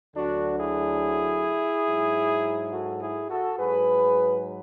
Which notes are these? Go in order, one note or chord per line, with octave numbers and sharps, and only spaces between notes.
D2 D3 F#3 D4 F#4
E4 G#4
G#2 F#3
F#4 A4
E4 G#4
F#4 A4
G#2 F#3 G#4 B4